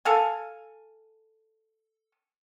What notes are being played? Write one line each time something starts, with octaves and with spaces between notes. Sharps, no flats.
A4 F5 G#5